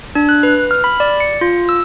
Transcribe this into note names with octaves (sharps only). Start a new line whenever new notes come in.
D4
F#6
B4
F6
B5
D5
C#7
F4
E6